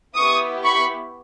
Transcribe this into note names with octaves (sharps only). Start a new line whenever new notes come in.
B3 E4 G4 C#6 D#6
B5 C#6